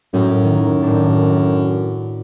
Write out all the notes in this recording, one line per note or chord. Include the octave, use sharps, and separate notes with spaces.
F#2 A2
D#3
A2 D4